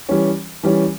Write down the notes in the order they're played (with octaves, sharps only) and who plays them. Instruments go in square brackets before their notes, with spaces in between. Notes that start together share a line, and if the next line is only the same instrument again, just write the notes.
[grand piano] E3 G3 C#4
E3 G3 C#4